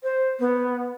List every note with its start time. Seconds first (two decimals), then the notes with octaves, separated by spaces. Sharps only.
0.03 C5
0.39 B3